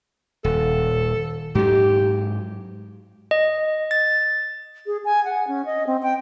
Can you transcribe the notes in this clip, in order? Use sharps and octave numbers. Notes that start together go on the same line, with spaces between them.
D#1 A4
G#2 F#3 G4
D#5
A6
G#4
G#5
F#5
C#4
D#5
C4
G5